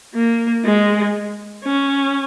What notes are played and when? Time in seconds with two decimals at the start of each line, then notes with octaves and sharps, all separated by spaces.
0.14 A#3
0.65 G#3
1.64 C#4